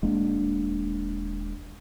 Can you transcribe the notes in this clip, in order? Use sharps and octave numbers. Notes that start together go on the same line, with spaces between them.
D#1 G#3 A#3 D4